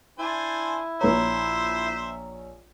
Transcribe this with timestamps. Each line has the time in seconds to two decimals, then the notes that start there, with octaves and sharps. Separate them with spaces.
0.19 D4 E4 C5 G#5
1.01 A#1 C5 C#5 E5 A#5